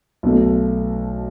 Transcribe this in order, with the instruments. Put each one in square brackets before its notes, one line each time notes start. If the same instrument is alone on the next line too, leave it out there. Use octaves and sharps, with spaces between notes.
[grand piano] B1 B2 A3